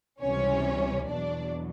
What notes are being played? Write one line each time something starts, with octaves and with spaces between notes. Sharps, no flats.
C#2 C3 E3 G3 C#4 C#5
E2 B2 F#3 D4 D5